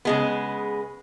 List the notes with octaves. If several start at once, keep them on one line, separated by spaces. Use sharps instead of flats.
C#3 G#3 B3